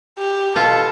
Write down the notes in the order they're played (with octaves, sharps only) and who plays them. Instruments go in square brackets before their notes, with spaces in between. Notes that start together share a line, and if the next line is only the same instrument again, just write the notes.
[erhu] G4
[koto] B2 F4 [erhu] A4